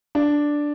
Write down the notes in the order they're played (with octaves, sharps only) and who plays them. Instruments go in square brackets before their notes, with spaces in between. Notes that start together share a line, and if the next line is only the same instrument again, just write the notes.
[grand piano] D4